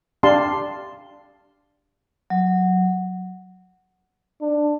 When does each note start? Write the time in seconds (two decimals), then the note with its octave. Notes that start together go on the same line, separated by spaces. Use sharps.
0.23 D4 G4 F5 A5 C6
2.30 F#3
4.41 D4